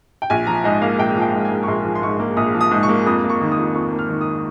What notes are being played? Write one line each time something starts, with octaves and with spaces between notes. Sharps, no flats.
G5
A#1 G#5
F3 A#5
G#2 D#5
A#3 F5
A#1 G5
F3
G5
G#2
G#5
A#3
C#6
A#1 C6
F3
C6
G#2 C#6
A#3
A#1 D#6
F3
D#6
G#2
C#6
A#3
F2 D#6
A#3
C#6
D#3
D#6
F2
F2 C#6
A#3
F6
D#3
D#6